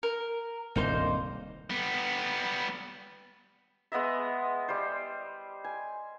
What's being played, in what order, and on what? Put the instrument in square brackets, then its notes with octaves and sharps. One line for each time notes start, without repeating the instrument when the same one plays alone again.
[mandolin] A#4
[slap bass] D#1 C2 G2 [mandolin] A#3 D#4 C5
[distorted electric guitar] G3 B3
[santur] G#3 B3 D#5 E5
G3 C5
G#5